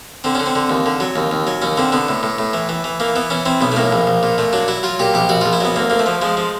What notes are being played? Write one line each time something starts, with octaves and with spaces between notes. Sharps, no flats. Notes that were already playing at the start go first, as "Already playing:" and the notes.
D3 C4
D3 C#4
C4
D3
D#2
D3
F#3
D#2
D#2
F#3
D#2 C#4
D3 C4
D3 B3
A2
A2
A2
E3
E3
E3
E3 A#3
E3 B3
E3 C#4
E3 C4
B1 B3
A3
A2 A#3
A#1
A#1
A#2
A#2 A3
F#3 D4
F#3 E4
F#3 F4
A#2 G4
A#1 G4
A#1 F#4
A#1 F4
E4
F#3 B3
D2 A#3
D2 A#3
A3
F3
F3 G#3
F3